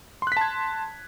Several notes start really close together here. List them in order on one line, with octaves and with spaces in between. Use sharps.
C6 F#6 B6 A5 G#6